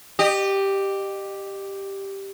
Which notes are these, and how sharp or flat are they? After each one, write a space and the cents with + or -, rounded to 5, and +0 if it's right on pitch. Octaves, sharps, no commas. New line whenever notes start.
G4 +0 D#5 -35